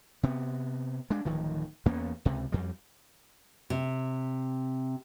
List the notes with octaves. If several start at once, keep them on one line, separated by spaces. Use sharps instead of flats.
C3 B3
G#3 D4
D1 D#3 F3
E2 A#3 B3 C#4
C#2 C3
F2 G3
C3